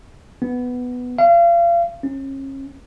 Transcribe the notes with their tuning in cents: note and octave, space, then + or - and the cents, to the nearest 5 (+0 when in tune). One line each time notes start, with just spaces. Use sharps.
B3 +5
F5 -35
C#4 -35